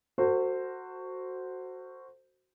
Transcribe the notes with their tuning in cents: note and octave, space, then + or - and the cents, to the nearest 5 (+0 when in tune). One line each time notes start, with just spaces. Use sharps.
F#4 +0 A4 +40 C5 +0